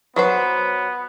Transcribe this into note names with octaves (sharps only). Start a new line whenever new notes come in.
F#3 B3 B4 C5